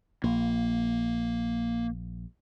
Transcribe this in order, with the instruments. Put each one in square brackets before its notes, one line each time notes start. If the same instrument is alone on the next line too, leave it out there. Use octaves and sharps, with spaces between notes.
[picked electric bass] A#1 [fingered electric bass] A#3